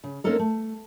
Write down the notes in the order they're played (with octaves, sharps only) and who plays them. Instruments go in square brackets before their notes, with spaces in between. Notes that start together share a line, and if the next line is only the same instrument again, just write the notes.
[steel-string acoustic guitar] C#3
A#3 C4 C#4 D#4 A4 A#4
A3